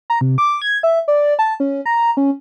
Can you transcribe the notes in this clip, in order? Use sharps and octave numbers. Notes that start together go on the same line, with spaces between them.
A#5
C3
D6
G#6
E5
D5
A5
C#4
A#5
C#4